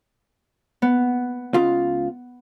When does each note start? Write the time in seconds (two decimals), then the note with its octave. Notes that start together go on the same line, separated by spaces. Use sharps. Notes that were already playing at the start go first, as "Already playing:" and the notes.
0.82 B3
1.54 C#2 C#3 F4